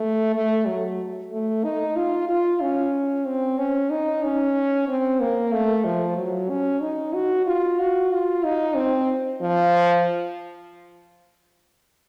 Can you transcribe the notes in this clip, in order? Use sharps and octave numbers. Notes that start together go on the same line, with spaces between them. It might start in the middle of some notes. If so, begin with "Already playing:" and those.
Already playing: A3
A3
F#3
A3
D#4
F4
F4
C#4
C4
C#4
D#4
C#4
C4
A#3
A3
F3
F#3
C#4
D#4
F#4
F4
F#4
F4
D#4
C4
F3